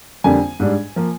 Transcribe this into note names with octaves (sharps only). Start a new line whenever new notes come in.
F2 D3 G3 A#3 D4 G#5
G#2 G3 D4
F3 A#3